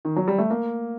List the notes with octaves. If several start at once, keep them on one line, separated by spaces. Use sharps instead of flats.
D#3
F#3
G3
A3
A#3